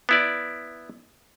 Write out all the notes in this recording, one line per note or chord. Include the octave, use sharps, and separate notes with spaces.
B3 E4 D5